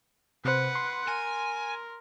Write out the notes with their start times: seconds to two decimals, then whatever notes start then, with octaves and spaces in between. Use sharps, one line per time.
0.45 C3 B4 C5 F#5
0.75 C6
1.08 A#4 G#5